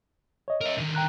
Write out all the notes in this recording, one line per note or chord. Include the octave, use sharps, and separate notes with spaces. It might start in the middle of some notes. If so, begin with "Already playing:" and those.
C#5 D#5
A#4 E5
D3 D#3
G5 A#5 F#6